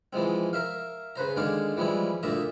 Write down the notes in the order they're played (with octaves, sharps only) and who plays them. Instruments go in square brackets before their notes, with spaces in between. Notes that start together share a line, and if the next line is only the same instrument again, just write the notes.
[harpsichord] E3 F3 G#3 C4
A#4 E5 F5
C#3 B4 C5 A#5
D#2 D3 G#3 G#4 F5 D6
E3 F3 G3 G#3 E4
D2 A#2 A#3 E5 A#5 D#6